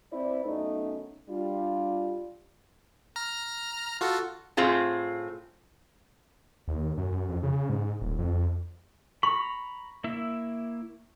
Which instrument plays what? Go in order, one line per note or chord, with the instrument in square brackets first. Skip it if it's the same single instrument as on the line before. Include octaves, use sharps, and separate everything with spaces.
[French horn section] C4 E4 B4 C5 D5
F#2 A3 B3 C#4 D#4
G3 D4 F4
[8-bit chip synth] A#5 F6
F4 F#4 A4
[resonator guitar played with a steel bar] A2 C4 F4 G#4
[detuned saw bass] D#2
F#2
F#2
F2
C#3
G#2
D#1
F2
[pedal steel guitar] A#5 B5 [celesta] C#6
[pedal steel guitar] A#3 E4 E5